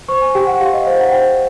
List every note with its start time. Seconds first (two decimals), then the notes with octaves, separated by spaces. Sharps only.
0.08 C5 C#6
0.21 G#5
0.35 G4 G5
0.47 F#5
0.60 G4 F5
0.73 D#5
0.86 C5 F5
1.00 F#5
1.12 C5 G5